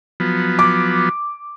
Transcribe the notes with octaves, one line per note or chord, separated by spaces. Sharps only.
F3 F#3 B3
D6